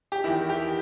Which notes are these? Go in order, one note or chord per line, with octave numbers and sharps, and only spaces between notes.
G4
E2 D#3 E4
G4